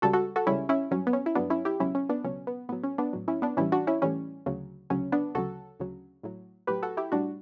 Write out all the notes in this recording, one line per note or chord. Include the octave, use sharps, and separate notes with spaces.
C#2 C#3 G3 F#4 A4
F#4 A4
F#4 A4
C#2 C#3 G3 C#4 E4
C#4 E4
G2 F#3 C#4
B3
C#4
E4
G2 F#3 B3 D4
C#4 E4
E4 G4
C#2 B2 F#3 C#4 E4
C#4
B3 D4
C#2 B2 F#3 C#4
B3
A2 F#3 B3
C#4
B3 D4
A2 F#3
C#4 E4
B3 D4
A2 E3 G3 C#4 E4
D4 F#4
C#4 E4
A2 E3 G3 C#4
D2 C#3 F#3
D2 C#3 F#3 C#4
B3 D4
D2 C#3 F#3 F#4 A4
D2 C#3 F#3
A2 F#3
A2 F#3 G4 B4
F#4 A4
E4 G4
A2 G3 D4 F#4